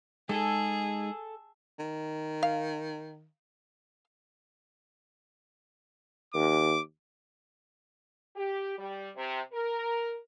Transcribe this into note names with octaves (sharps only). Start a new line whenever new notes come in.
G#3 D#4 G#4 A4
D#3
F5
D#2 D6
G4
G3
C3
A#4